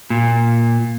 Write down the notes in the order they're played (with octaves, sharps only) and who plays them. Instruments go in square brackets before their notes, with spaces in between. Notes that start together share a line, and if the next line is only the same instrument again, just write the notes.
[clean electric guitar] A#2